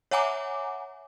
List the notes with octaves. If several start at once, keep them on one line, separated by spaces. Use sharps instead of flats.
C#5 E5 F#5 G#5 A#5 D6